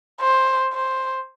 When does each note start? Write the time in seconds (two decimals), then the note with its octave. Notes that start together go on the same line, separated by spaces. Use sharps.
0.20 C5
0.73 C5